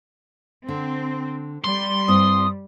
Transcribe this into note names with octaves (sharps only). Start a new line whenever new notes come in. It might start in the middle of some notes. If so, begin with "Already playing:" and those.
D3 C4
G3 C6
G2 C4 E4 D#6